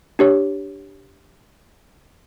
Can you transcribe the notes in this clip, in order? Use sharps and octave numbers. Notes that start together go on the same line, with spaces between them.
D4 G4 C#5